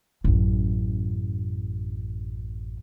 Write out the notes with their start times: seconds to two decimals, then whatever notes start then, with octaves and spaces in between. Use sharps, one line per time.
0.24 A1 F#2